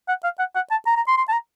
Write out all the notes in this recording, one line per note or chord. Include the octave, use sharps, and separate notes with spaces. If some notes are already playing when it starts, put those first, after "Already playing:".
F#5
F5
F#5
F#5
A5
A#5
A#5
C6
C6
A5
A#5